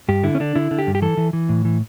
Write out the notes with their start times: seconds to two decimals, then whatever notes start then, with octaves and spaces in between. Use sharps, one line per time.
0.08 G2 G4
0.23 D3 E4
0.35 C#4
0.40 D3 D4
0.55 D3 E4
0.71 D3
0.79 G4
0.87 G2
0.95 G4
1.02 E3 A4
1.17 E3
1.33 E3
1.49 A2
1.65 E3